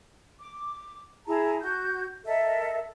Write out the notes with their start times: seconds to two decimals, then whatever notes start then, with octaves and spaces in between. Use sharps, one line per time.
0.39 D6
1.27 E4 G#4 A5 A#5
1.61 F#4 G6
2.25 A4 A#4 D#5 E5